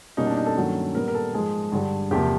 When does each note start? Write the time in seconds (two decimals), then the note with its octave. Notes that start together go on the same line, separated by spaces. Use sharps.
0.17 B2 G3 A#3 C#4 D#4
0.27 D4
0.37 D#4
0.46 A4
0.56 G2 D#3 F#3 A#3 C#4
0.95 A#2 G3 B3 A#4
1.08 A#4
1.15 A4
1.34 G#2 F3 G#3 G#4
1.72 G2 D3 G3
2.11 E2 C3 F3 A#3 G4